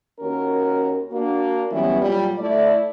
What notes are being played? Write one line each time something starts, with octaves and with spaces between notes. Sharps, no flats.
D#2 C#4 F#4 A#4
A#3 D4 F#4
E3 F#3 G3 B3 C#4 E4
A#2 F#3 G3
A3 E4 D5